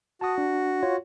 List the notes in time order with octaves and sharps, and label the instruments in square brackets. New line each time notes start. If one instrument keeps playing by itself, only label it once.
[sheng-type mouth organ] F#4 [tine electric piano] A5 D#6
[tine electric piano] D4
F4 C#5